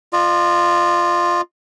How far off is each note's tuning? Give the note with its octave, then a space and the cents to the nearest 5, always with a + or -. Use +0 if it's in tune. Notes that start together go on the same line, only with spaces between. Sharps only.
F4 +0 D#5 -45